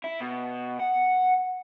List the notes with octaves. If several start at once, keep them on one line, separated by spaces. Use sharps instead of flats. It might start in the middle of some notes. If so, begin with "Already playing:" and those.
E4
B2
F#5